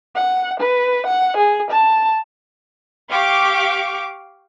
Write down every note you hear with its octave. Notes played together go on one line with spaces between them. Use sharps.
F#5
B4
F#5
G#4
A5
G4 F5 C#6 D6